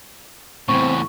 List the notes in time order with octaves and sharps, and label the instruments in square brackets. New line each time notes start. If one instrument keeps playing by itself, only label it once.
[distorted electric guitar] E2 A2 [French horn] C4 [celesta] C#6